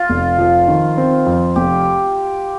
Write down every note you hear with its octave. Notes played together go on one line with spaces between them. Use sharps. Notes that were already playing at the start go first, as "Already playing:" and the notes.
Already playing: F4
F1
F3
D#3
C4
F2
F1 G4